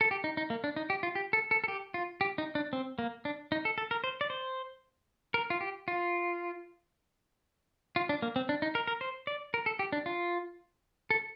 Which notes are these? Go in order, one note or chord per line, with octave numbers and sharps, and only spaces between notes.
A4
G4
D#4
D#4
A#3
D4
D#4
G4
F4
G4
A4
A4
A4
G4
F4
G4
D#4
D4
C4
A#3
D4
D#4
A4
A4
A#4
C5
D5
C5
A#4
F4
G4
F4
F4
D4
A#3
C4
D4
D#4
A#4
A#4
C5
D5
A#4
A4
G4
D4
F4
A4